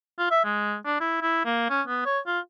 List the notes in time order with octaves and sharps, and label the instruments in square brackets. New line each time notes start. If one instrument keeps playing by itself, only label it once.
[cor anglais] F4
E5
G#3
D4
E4
E4
A#3
C#4
B3
C#5
F4